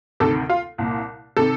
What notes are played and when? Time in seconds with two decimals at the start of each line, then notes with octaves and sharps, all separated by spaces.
0.20 D2 C3 D#3 A4
0.49 F4
0.78 C2 A#2
1.37 C3 D#3 A4